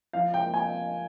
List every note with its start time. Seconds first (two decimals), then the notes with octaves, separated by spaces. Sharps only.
0.13 F3 F5
0.34 G5
0.40 A#3
0.54 G#5